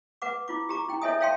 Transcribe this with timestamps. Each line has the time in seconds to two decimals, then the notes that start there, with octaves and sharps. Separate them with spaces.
0.22 B4 F#5 D6
0.48 E4 F4 D6
0.69 G4 A#5 D6
0.88 E4 G5
1.02 A4 C#5 D#5 E5 G#5 D#6
1.20 C#5 E5 F5 G5 A5 C6